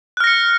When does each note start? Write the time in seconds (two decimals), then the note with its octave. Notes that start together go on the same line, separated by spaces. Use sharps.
0.17 F#6
0.20 F6
0.24 A#6
0.27 C#7